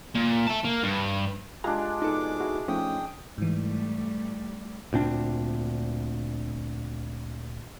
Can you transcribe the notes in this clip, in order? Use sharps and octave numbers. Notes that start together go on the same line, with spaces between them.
A#2
E5 A5
A#3
G2
G#3 D4 F4 G4 G#5 A#5
B2 D#4 A4 D6
E4 F#4 G#4
F3 A3 C#4 D#4 G5 D#6
G#2 E3 G3 A3
D2 A#2 C4 D4